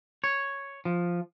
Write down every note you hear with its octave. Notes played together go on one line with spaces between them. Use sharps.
C#5
F3